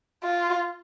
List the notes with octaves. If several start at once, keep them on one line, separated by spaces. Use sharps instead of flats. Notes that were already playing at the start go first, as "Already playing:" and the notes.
F4